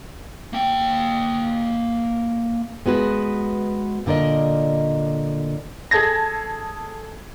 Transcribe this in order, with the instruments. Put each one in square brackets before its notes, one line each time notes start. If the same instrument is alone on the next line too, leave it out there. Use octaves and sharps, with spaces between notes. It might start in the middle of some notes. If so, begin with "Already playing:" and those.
[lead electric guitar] A#3 G5
[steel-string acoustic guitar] G#3 B3 F#4 B4
A#2 D3 A#4 D5 D#5
[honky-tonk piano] G#4 A4 A5 G#6 A#6